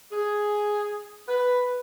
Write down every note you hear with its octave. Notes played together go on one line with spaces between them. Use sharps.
G#4
B4